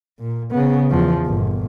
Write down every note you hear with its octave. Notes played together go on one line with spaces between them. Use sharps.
A#2
C#3 B3
E2 F3
G1 A#2